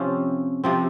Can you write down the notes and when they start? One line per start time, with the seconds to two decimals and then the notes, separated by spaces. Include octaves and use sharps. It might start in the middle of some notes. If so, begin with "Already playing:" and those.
Already playing: C3 F3 C4 C#4
0.64 C3 F3 C4